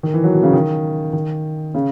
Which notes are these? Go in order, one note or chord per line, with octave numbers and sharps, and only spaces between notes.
D#3
E3
F#3
B2
C#3
D#3
D#3
C#3